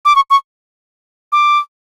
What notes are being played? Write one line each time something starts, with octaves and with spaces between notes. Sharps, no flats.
D6
C#6
C#6
D6